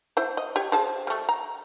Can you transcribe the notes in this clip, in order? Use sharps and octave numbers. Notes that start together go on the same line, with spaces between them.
E4 C5
D#5
G4 C#5
F3 G#4 A5
G3 A3
A#5